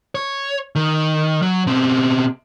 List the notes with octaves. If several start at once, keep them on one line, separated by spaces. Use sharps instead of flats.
C#5
D#3
F#3
B2 C4